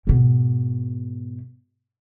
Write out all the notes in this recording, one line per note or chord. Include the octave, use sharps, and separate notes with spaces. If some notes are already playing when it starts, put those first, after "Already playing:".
G#2 B2